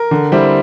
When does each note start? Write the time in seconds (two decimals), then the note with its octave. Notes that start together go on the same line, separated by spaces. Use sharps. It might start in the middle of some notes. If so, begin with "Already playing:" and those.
Already playing: A#4
0.11 D3
0.32 G3 C4 E4